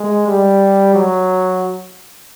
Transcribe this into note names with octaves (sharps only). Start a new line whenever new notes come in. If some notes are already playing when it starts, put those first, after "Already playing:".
Already playing: G#3
G3
F#3